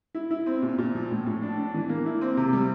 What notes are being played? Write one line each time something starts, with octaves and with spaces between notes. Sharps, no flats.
E4
E4
C4
A#2
A#2
F3
A2
A2
D4
D4
E3
A#3
E4
C4
C3
G3